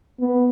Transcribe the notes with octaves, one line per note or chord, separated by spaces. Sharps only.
B3